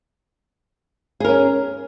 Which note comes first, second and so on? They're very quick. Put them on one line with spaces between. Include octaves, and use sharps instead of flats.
G#4 A#4 C#4